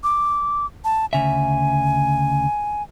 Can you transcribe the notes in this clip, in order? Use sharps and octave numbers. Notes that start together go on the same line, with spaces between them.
D6
A5
D2 C#3 E5 G#5